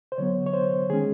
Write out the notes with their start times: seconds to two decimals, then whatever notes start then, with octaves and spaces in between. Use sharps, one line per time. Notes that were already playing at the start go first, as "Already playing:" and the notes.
0.12 C5
0.18 D3 F#3 B3 C#5
0.46 C#5
0.53 C5
0.90 D#3 G#3 C#4 G#4